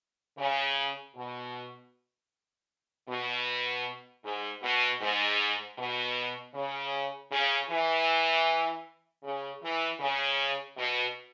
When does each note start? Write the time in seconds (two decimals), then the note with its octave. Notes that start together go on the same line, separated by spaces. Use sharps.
0.39 C#3
1.16 B2
3.09 B2
4.24 G#2
4.63 B2
5.01 G#2
5.78 B2
6.55 C#3
7.32 C#3
7.70 E3
9.24 C#3
9.62 E3
10.00 C#3
10.78 B2